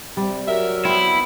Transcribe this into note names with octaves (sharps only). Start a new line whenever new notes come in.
C3 G3
F#3 A#4 E5
B3 C4 E4